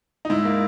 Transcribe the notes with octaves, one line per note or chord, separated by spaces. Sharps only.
D#4
G#2 E4
A#3